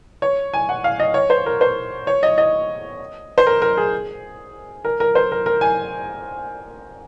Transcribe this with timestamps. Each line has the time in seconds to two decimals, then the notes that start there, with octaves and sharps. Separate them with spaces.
0.22 C#5
0.54 G#5
0.69 F#5
0.84 F5
1.00 D#5
1.14 C#5
1.30 C5
1.46 A#4
1.61 C5
2.07 C#5
2.23 D#5
2.38 D#5
3.38 C5
3.47 A#4
3.62 A#4
3.77 G#4
4.85 A#4
5.00 A#4
5.15 C5
5.32 A#4
5.46 A#4
5.61 G#5